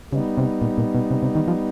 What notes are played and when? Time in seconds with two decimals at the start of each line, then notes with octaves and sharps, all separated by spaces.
0.13 C#3 G3 B3 D#4
0.38 C3
0.62 A#2
0.78 A#2
0.95 B2
1.11 C3
1.23 C3
1.35 D#3
1.48 F3